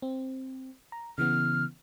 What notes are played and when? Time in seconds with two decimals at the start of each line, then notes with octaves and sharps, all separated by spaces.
0.02 C4
0.92 A#5
1.18 C#3 E3 B3 F6